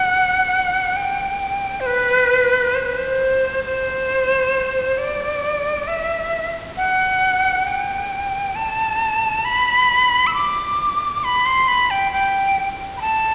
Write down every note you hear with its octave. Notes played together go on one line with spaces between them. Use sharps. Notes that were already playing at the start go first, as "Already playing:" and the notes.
Already playing: F#5
G5
C5
B4
C5
B4
C5
C5
D5
E5
F#5
G5
A5
B5
E6
D6
B5
C6
B5
G5
G5
B5
A5